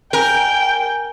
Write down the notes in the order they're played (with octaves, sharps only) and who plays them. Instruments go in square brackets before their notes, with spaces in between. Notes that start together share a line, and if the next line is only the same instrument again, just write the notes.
[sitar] A#4 [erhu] G5 [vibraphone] G#5